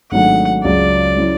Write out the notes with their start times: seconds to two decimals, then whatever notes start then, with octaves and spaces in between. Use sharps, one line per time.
0.11 G#1 G#2 F#3 A3 D4 F#5
0.64 C#2 C#3 F#3 D5
1.17 F#3 C#4 E4